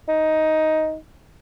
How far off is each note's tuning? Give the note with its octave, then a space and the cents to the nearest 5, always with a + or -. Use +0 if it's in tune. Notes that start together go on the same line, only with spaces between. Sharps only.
D#4 +10